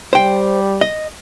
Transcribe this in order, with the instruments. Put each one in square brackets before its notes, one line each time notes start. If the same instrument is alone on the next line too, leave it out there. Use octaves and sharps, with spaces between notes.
[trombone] G3 [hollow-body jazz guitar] C5 G5
[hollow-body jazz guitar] D#5